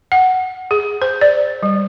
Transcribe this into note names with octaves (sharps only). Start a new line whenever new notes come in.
F#5
G#4
C5
D5
G3